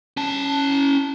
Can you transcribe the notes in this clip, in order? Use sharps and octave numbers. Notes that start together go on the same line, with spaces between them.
C#4 A5